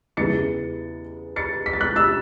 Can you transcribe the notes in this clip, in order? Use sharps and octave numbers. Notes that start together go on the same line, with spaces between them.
E2 C#3 E3 A6 C#7
A6 C#7
B6
A6
F#6 B6
E6 A6